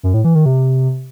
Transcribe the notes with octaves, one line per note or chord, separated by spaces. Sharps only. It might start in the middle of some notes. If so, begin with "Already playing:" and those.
F#2
A2
E3
D#3
C3